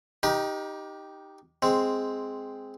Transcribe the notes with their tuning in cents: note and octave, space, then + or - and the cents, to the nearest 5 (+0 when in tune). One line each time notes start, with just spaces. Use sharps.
D#4 +0 G4 +0 A#4 +45
G#3 +0 C4 +0